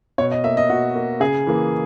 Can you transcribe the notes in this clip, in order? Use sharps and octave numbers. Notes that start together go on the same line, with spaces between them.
B2 C#5
D#5
A#3 E5
D#5
B2 F#4
A#3
C#3 G#4
E3 A#3